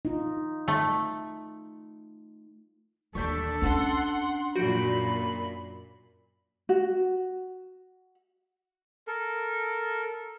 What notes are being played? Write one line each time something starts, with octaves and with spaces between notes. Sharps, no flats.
D#4 F4
A3
D#2 E3 D4 A4 C#6 G6 B6
C#4 D4 F#5 C6 F#6
F#2 A#2 F#4 B5 G6 D7
F#4
A4 A#4